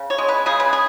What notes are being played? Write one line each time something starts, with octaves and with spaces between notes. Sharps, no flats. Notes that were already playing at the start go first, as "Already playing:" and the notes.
Already playing: C#3
C#5
G#3
B4
C#3 G#4
B4
G#4